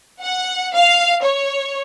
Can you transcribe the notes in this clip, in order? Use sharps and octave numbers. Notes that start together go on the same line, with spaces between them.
F#5
F5
C#5